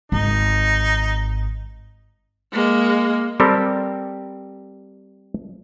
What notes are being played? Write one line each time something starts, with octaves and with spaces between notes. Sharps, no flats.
G#1 D#4
G#3 A#3
G3 C4 G4 A4 A#4